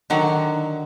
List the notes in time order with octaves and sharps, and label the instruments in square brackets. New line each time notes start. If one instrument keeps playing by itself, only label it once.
[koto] D3 D#3 F#3